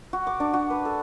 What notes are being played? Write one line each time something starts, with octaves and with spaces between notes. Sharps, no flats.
F#4
D6
D4
F#4
B4
A4